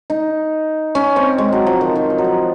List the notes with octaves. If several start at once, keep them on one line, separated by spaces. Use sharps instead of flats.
D#4
C#4
C4
G#3
F#3
F3
D#3
D#3
F3
F#3
F3